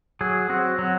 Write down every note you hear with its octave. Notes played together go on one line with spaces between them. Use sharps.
F#3 G#4
C4 F#4
F#3